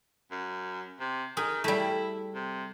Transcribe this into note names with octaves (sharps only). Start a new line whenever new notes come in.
F#2
C3
D#3 G#4
G3 A3 E4
C3